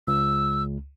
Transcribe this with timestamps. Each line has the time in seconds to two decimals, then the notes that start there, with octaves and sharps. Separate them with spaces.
0.07 C#2 E6